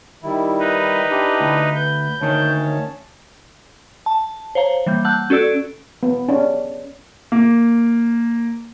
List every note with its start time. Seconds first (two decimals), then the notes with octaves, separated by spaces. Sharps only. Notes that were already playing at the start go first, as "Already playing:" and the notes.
0.23 D#3 G3 E4
0.59 D#4 B4
1.11 D4 E4 G4
1.40 D2
1.75 B4 G6
2.21 D2 D#3 C#4 C#5 A5
4.06 A5
4.55 C5 C#5 F5 A#5
4.86 E3 G3 A#3 G6
5.05 F#5 A5 E6 F#6 G6
5.30 C#4 F#4 A4 D5 E6 D7
6.03 B3
6.28 C#4 D4
7.32 A#3